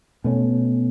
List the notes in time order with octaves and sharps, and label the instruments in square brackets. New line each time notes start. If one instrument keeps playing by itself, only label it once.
[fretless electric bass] B2 A3 C#4